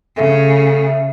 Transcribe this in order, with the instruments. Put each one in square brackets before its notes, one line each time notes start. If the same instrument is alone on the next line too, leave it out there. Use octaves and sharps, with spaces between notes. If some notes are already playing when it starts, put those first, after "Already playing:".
[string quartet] C#3 [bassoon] A3